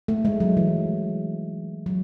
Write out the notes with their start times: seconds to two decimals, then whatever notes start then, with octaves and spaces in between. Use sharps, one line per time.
0.08 A3
0.25 G#3
0.40 F#3
0.57 E3
1.86 F#3